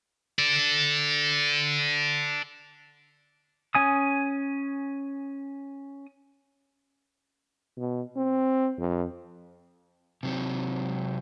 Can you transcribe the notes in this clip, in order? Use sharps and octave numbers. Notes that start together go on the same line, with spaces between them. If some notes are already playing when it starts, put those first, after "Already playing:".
A4 D5
C#4 G#5 D#6
B2
C4
F2
C3 F#3 C4